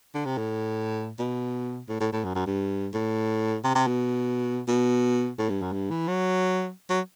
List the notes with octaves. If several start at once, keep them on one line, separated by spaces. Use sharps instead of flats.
D3
C3
A2
B2
A2
A2
A2
F#2
F#2
G2
A2
C3
C3
B2
B2
A2
G2
F#2
G2
E3
F#3
F#3